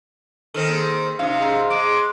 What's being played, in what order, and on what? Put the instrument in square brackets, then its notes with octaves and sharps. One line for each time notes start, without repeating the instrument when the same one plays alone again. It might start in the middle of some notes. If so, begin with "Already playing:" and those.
[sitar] D#3 C4 [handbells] A4 F6
[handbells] A#3 G#4 C5
[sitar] F#2 C3 [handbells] D#4 D#6 [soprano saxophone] F5
[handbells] G#4 D#5 A#5
[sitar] G#3 [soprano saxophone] D6